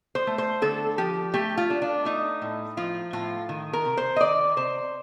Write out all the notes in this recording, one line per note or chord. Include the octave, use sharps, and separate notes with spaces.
C5
A3
C5
D3 A4
F3 G4
A3 G4
F4
D4
D4
A3 D#4
A2
F3 F4
A2 F4
D#3
A#4
C3
C5
D#5
D#3 D5
C3 C5